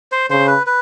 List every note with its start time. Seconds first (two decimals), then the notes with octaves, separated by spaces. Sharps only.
0.12 C5
0.30 C#3 C5
0.47 B4
0.67 B4